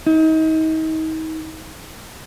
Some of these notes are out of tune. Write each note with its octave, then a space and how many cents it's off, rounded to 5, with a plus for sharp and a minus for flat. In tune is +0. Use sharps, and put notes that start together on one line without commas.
D#4 +35